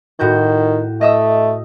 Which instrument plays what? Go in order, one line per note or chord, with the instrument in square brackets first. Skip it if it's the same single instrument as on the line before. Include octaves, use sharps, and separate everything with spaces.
[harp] A2 F#4 G6 [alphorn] D#3
[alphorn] A3 [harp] D#5 E5 D#6